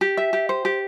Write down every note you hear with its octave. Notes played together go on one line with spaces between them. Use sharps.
G4
E5
G4
C5
G4